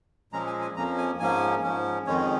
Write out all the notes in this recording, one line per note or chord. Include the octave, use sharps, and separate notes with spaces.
A#2 F3 G#3 C#4 A#5
G#5
G#5
F2 F3 A#3 C#4 A#5
G#5
G#2 F3 A#3 C#4 G#5
G#2 F3 C#4
F2 D#3 G#3 C#4 C#5